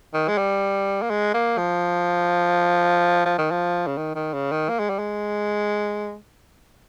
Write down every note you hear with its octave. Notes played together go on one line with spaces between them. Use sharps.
D#3
G#3
G3
A#3
G#3
A#3
F3
F3
D#3
F3
C#3
D#3
D#3
C#3
D#3
A#3
G#3
G3
G#3